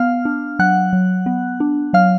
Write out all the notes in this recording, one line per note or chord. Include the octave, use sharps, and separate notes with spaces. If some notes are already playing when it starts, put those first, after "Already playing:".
Already playing: B3 F5 F6
D4
F#3 F#5 F#6
F#3
B3
D4
F#3 F5 F6